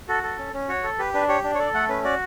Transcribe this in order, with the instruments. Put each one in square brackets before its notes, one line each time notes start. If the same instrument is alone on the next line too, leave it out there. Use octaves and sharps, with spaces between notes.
[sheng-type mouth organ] F#4 A4
A4
C#4
C#4
F#4 C#5
A4
G4 B4
D4 B4
G4 C#5
D4
C#5
A4 D5
A3 F#5
C#4 B4
F#4 D5